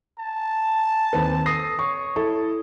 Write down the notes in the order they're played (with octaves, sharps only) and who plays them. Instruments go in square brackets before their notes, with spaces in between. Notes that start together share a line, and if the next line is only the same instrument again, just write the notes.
[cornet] A5
[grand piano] D#2 C4 B4
[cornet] A4 [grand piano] D#6 A#6 C7
[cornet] C#5 [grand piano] C#6
[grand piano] E4 A4